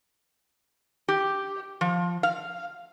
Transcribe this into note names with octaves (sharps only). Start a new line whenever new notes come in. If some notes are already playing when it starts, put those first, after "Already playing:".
G4
F3
F5